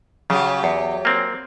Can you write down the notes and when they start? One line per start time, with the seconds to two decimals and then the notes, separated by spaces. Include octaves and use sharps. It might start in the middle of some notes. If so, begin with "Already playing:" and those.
0.30 C#3 F#3 G4 G#4
0.64 E2
1.05 A#3 C4